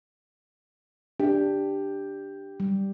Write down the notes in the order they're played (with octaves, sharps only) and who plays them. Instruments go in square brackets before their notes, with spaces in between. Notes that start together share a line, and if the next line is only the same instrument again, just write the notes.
[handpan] D4 [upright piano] G4
[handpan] G3